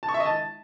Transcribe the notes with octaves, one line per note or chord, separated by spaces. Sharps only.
A5
C#6
E5
D#5
A5